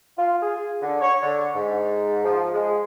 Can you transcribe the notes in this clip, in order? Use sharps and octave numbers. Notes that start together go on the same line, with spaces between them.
F4
G#4
D3
C#5
D3
G#2
F3
G#3